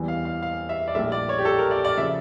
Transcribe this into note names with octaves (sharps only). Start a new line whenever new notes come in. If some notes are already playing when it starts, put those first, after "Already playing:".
Already playing: E2 E3 G3
F5
F5
F5
E5
D5
A#1 A2 G3 E5
D5
C#5
G4
A4
A#4
D5
D5
C#3 F3 E5